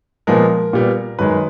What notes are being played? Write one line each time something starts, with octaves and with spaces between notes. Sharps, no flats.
A#2 F3 G#3 B3 A#4
A#2 G3 B3
F#2 D#3 G#3 B4